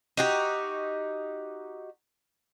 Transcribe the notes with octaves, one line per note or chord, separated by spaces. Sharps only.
D#4 F#4 G4